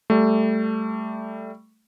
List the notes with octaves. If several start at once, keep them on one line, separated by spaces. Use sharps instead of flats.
G3 A3